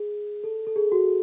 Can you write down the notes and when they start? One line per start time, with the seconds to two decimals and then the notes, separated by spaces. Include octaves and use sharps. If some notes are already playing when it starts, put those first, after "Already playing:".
Already playing: G#4
0.44 A4
0.67 A4
0.76 G#4
0.92 F#4